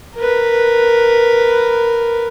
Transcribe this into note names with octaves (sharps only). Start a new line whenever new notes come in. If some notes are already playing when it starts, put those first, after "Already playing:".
A#4 B4